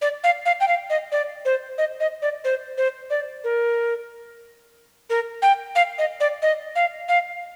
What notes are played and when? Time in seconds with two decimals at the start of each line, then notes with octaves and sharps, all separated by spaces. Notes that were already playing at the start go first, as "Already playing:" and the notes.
0.02 D5
0.24 F5
0.46 F5
0.60 G5
0.68 F5
0.90 D#5
1.12 D5
1.45 C5
1.78 D#5
2.00 D#5
2.22 D5
2.44 C5
2.78 C5
3.10 D5
3.44 A#4
5.10 A#4
5.42 G5
5.75 F5
5.98 D#5
6.20 D5
6.42 D#5
6.76 F5
7.08 F5